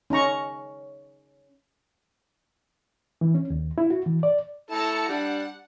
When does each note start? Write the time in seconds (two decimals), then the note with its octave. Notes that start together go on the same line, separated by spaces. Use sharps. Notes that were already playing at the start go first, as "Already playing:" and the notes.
0.10 C#4 D#4 A#5 C#6
3.21 E3
3.35 C#4
3.50 D#2
3.78 E4
3.90 F#4
4.06 E3
4.23 D5
4.71 E4 A4 A5 A#5 C#7
5.09 G3 D4 F#5